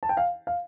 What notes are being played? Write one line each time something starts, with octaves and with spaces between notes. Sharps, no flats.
A5
G5
F5
F5